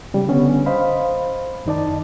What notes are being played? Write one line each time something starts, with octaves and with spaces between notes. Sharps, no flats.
C#3 G3
D3 B3 C#4
C5 D#5 F5 B5
F#2 D#3 D#4 D5 A5